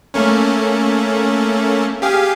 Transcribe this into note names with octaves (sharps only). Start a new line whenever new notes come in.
A3 A#3 C#4
G4 G#4 F5